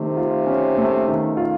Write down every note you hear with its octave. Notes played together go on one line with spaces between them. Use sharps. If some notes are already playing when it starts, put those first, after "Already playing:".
Already playing: C3 D#3 A3
F4
C#4
A3
D#3
F4